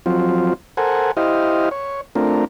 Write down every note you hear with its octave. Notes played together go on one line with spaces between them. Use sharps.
F3 F#3 C4 F4
A4 A#4 C5 F#5 G#5
E4 G4 C5 D#5 F5
C#5
A3 C4 D4 F4 A#4